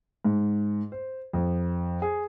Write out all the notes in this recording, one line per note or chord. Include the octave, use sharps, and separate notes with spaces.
G#2
C5
F2
G#4